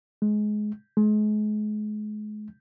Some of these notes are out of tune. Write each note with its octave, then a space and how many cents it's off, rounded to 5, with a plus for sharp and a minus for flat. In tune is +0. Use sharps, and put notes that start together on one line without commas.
G#3 +20
G#3 +35